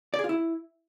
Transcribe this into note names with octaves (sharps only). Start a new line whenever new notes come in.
D5
G#4
F4
E4